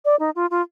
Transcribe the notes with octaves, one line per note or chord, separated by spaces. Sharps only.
D5
D#4
F4
F4